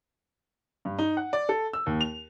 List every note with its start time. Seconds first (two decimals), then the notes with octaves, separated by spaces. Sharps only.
0.85 G2
0.98 D#4
1.17 F#5
1.33 D5
1.49 A4
1.73 E6
1.86 D#2
2.01 F7